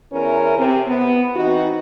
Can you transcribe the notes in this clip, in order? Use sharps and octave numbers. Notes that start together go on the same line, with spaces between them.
E2 C#4 E4 A#4
C3
B3
E3 C4 D#4 F#4